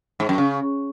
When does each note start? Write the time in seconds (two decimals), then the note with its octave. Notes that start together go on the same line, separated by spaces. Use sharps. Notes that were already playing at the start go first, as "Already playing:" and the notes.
0.20 G#2
0.29 F#2
0.38 C#3